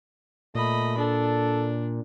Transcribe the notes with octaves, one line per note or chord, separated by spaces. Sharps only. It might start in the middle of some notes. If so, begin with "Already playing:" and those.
A#2 A3 D#5 B5
D4 A4